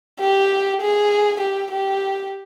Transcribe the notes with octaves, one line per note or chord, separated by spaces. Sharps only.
G4
G#4
G4
G4